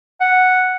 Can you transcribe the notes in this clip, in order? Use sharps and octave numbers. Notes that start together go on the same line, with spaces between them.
F#5